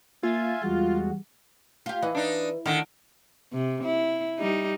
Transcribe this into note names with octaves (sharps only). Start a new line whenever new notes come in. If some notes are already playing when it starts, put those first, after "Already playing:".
A#3 F4 E5 G#5
E2 G3 G#3 F#4
F4 G4
E3 B4 D#5
D4 D#4
D3 D#3
C3
E4
G3 D#4